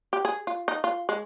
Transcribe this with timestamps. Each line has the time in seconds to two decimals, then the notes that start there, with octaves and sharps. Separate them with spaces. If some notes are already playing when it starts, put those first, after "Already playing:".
0.13 G4
0.25 G#4
0.47 F4
0.68 D#4
0.84 F4
1.09 G#3